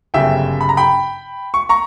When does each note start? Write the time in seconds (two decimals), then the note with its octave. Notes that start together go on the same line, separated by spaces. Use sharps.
0.14 G1 F#2 C#3 G3 E5 G5
0.61 B5
0.69 A#5
0.77 G5 B5
1.54 C#6
1.69 A#5 C#6